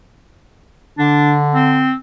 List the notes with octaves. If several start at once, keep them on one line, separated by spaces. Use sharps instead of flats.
D3 D4
C4